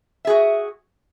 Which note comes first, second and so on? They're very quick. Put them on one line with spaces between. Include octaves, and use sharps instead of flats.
E5 G#4 F#4